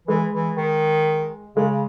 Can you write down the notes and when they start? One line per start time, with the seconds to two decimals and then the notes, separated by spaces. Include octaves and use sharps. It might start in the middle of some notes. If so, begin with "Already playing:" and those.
0.07 E3 G#3
0.33 E3
0.57 D#3
1.56 C#3 G#3
1.70 C#3